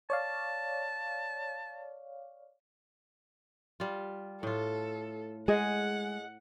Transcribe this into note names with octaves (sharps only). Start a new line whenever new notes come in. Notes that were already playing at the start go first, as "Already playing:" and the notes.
C#5 D5 F5 A5
G3 F4
A2 F4 A4
G#3 G#4 D#5 F#5